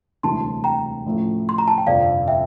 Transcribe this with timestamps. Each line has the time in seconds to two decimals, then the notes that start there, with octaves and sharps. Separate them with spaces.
0.23 E1 D2 C3 E3 G3 A5 C6
0.64 G5 A#5
1.06 A1 A2 F3 A3 E4
1.49 C6
1.58 A#5
1.68 A5
1.78 G5
1.87 G1 F2 C3 F3 D5 F5
2.28 E5 G5